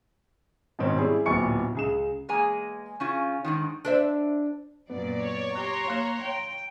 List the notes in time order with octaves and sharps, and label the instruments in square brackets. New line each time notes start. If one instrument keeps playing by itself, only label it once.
[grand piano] G#2 B2 D#3 C4 C#4
G3 C4 E4 G#4
D1 A#2 B3 G#5 C#6 C#7
C#2 G#4 E7
[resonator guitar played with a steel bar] E2 G#3 A#3 G#4 G#5 A#5
C#3 C#4 F4
G#2 D3 D#3
[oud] D4 C5 E5
[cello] F#2 A#2 [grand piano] B3 [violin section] D5
[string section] C#5
[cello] G4 [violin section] A#5 C6 [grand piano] F#6
[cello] A#3 [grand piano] F5 F#6 E7
[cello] G5